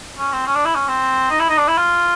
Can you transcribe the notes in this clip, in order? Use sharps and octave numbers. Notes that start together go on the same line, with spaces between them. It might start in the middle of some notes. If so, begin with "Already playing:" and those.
C#4
C4
C#4
D4
E4
C#4
C4
D#4
E4
D#4
D4
E4
F4